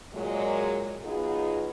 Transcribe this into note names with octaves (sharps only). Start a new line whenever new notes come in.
A#2 F#3 G#3
F#3 B3 D#4 F4 F#4 G#4